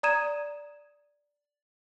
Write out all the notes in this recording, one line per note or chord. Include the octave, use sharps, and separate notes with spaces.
D5 A#5 D#6 G#6 D#7 E7